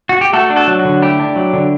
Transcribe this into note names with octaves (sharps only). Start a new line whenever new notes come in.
F#4
G4
A3 F#4 A4
D4
F#4 A4
F#3
F#4
D3
A3 E4 G4
D4
F#3
D3